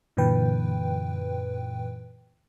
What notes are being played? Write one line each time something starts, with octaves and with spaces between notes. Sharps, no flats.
F#2 A#2 D3 E3 B4 G5